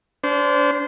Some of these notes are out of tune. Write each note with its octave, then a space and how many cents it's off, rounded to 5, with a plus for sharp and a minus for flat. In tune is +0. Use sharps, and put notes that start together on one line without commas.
D4 -35 C5 -20